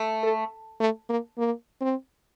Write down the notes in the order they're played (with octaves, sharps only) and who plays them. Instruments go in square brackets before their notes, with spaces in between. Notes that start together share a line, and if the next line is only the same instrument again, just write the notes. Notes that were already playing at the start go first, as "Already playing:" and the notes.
Already playing: [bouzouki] A3
[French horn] A4
A3
A#3
A#3
C4